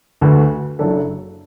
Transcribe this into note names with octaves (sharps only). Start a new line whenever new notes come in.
D2 D3 A3 F#4 B4
F#1 F#2 F#3 D4 A4